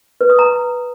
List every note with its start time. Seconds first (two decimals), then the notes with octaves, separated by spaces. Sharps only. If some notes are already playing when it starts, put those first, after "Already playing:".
0.21 B4
0.30 D#6
0.39 A#5